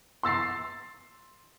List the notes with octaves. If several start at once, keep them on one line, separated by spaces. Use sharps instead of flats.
C6 E6 A6 C7